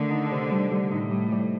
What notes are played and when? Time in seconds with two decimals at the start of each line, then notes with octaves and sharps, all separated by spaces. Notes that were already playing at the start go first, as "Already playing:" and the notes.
Already playing: D3 D#3 A3
0.11 D#4
0.31 C3
0.51 G3
0.71 G3
0.91 A2 D#4
1.11 G3
1.32 G3